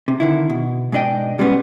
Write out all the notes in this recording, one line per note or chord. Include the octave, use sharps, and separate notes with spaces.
C3
D3 D#3 E4
B2
G#2 B2 D4 D#5 G5
B2 G3 G#3 A#3 B3 C#4